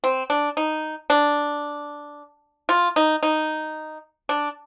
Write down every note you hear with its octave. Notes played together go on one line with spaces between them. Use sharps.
C4
D4
D#4
D4
F4
D#4
D#4
D4